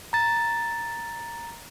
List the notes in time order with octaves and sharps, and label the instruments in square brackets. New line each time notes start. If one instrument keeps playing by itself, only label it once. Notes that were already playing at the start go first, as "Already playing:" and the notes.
[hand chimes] A#5 A6